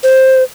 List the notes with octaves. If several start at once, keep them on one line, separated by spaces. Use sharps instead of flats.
C5